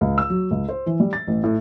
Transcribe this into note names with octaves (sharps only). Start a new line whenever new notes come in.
C#2
E6
F#3
C#2
C5
E3
G3
A6
A1
A2